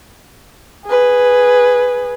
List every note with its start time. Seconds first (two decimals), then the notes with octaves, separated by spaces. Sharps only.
0.86 G#4 B4